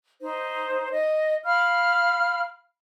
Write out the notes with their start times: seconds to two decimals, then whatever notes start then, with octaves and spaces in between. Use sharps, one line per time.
0.21 D#4 C5
0.92 D#5
1.45 F5 B5 F6